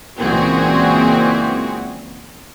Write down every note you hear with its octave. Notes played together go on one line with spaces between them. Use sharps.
C#2 A#2 E3 C4 F#4 G#4